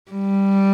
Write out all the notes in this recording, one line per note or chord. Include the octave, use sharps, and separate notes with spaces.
G3